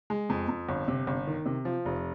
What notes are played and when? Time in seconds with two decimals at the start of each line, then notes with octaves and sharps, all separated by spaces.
0.10 G#3
0.30 F2
0.48 F2
0.69 G1
0.88 C3
1.07 G1
1.27 D#3
1.46 C3
1.65 F3
1.85 F1